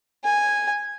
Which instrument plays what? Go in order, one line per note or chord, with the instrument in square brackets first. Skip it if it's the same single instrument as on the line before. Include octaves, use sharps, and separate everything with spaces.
[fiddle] G#5